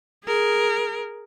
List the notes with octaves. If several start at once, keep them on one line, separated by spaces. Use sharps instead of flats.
G#4 A#4